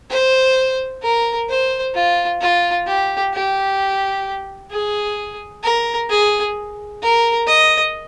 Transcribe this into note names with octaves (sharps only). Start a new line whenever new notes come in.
C5
A#4
C5
F4
F4
G4
G4
G#4
A#4
G#4
A#4
D#5